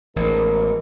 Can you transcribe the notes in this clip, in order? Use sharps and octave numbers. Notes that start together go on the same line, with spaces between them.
A1 G#2 B2 A#4